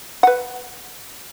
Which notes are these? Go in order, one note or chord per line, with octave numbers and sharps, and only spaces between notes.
B4 F#5